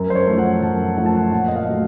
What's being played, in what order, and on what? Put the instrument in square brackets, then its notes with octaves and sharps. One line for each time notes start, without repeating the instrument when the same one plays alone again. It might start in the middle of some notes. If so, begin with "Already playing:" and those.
Already playing: [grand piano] F#2 A#4
C5
C#5
F3 A3
F#5
F#2 A5
F3 A3 F#5
A5
F#5
A#2 F#5
D#5
F5
F#3 A3